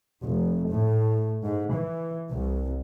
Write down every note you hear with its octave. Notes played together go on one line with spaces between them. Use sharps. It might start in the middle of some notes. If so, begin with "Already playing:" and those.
F1
A2
G#2
E3
C2